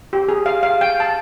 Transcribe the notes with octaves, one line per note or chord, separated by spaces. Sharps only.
G4
G#4
F5
F5
G5
A5